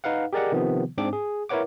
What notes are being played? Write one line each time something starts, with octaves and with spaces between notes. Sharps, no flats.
D#4 B4 F5 F#5
G4 G#4 A#4 D5 D#5 F#5
C3 D#3 F3 B3
G#2 C4 D4 D6
G#4
E4 A#4 B4 C#5 F#5 D6